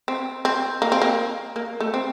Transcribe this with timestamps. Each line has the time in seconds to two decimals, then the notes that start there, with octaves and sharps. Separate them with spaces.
0.08 C4
0.45 C4
0.82 A#3
0.92 C4
1.02 A#3
1.56 A#3
1.80 A3
1.94 C4